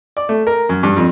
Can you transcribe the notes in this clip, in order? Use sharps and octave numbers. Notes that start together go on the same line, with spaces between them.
D5
A3
A#4
F#2
G2
F2